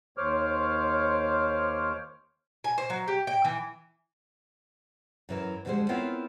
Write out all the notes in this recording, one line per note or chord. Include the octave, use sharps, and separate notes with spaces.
D#2 C5 C#5 D6 F6
G#5
C5
F#3
G4
G5
E3
F#2 E3 A#4
F2 D3 D#3 G3 G#3 C5
B3 C4 E4 F4 A#4 C#5